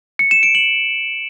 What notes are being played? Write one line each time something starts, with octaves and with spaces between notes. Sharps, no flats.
C#7
E7
D7
F#7